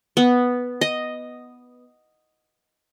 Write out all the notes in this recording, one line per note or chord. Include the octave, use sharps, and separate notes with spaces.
B3
D#5